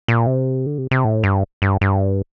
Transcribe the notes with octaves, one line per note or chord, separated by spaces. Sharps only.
A#2
C3
D3
C3
C3
A2
G2
G2
G2